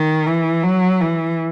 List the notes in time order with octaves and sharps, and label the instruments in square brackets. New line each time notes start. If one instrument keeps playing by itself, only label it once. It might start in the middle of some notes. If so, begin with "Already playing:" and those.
Already playing: [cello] D#3
E3
F#3
E3